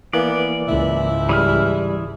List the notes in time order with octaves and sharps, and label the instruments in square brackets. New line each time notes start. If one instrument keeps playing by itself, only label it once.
[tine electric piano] E3 A#3 [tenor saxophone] B3 [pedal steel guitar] D5
[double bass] C#2 G#2 [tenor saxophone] E4
[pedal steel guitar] E3 G#4 F6 [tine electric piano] G3